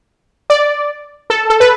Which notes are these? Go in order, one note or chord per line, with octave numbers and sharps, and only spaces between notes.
D5
A4
A4
B4